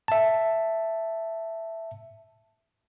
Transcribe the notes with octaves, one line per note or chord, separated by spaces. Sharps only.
E5 A5